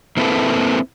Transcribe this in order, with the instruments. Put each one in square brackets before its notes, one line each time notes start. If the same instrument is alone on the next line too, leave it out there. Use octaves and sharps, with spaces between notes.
[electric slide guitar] A#3 C4 E4 A4 B4